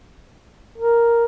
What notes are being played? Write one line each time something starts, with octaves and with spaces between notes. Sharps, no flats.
A#4